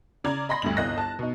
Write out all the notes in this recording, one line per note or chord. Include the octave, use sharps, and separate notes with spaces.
C#3 D5 A#5 G#6
D#5 B5 C6 A#6
D2 G2 F#7
G1 C2 D#5 F#6 A#6
A5
B2 D#4